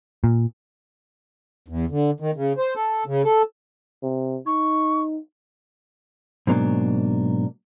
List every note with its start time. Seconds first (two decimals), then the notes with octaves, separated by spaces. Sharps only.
0.24 A#2
1.68 E2
1.90 D3
2.20 D#3
2.36 C#3
2.58 C5
2.75 A4
3.06 C#3
3.24 A4
4.03 C3
4.46 D#4 C#6
6.47 G#2 B2 F#3 A#3 D4